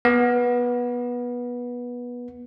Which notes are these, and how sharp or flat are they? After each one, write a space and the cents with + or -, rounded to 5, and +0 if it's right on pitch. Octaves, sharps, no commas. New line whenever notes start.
B3 -20